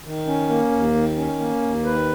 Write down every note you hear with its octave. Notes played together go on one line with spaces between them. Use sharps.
D#3
C#4
A#3
D#2
D#3
C#4
A#3
D#2
D#3 B4